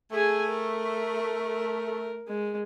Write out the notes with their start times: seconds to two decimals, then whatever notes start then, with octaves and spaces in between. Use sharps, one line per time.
0.12 A3 G#4 G#5
0.49 A#4
2.28 G#3